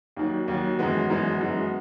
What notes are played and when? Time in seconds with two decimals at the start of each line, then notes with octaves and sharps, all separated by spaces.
0.17 D#2 D#3 F#3
0.48 D#2 D#3 F#3
0.79 F#2 E3 G#3 B3
1.10 F#2 E3 G#3 B3
1.41 F#2 E3 G#3 B3